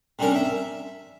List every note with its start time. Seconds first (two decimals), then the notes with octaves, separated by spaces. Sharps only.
0.19 C3 G3 C#4 D4 A#4
0.35 E5